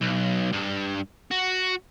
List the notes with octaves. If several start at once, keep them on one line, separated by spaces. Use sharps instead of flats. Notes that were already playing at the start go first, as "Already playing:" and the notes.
B1
G2
F#4